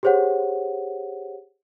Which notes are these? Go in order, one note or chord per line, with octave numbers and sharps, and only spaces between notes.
G4 G#4 C5 C#5 F#5